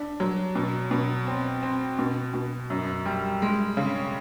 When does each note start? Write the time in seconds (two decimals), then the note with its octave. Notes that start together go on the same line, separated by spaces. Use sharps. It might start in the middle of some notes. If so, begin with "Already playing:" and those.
Already playing: D4
0.20 F#3
0.55 B2
0.91 B2
1.27 C4
1.63 C4
1.99 B2
2.34 B2
2.70 F#2
3.06 G3
3.42 G#3
3.77 C#3